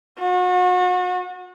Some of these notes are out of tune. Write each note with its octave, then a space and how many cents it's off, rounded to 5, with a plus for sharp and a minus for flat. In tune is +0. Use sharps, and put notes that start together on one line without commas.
F#4 -35